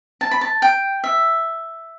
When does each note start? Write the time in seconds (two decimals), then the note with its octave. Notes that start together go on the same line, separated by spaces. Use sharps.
0.21 A5
0.31 B5
0.41 A5
0.62 G5
1.04 E5